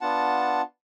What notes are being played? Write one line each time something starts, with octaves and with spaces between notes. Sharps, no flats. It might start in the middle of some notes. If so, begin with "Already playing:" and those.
B3 D4 F4 F#5 A5